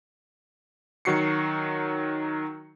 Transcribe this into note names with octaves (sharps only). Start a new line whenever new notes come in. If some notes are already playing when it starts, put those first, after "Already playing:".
D#3 F#3 F#4 C7 C#7